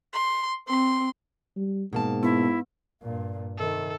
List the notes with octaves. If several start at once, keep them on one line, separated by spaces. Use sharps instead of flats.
C6
C4 C6
G3
G#2 B2 A#3 A5
B3 E4
G2 A#2
C3 D#3 A4